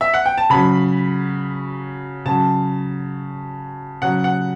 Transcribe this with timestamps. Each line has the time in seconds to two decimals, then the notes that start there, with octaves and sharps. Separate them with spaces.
0.01 E5
0.14 F#5
0.26 G5
0.37 A5
0.50 C#3 F#3 B5
2.25 C#3 F#3 A5
4.02 C#3 F#3 F#5
4.24 F#5